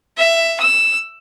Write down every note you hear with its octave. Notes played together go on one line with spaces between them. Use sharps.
E5
E6